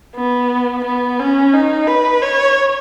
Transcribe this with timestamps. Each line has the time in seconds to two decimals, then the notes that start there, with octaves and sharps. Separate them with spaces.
0.15 B3
0.84 B3
1.19 C#4
1.53 D#4
1.87 B4
2.22 C#5